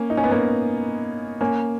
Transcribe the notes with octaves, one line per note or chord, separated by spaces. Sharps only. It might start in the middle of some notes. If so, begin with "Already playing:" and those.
Already playing: A#3 C#4
D#4
C#4
B3
A#3 C#4
A#3 C#4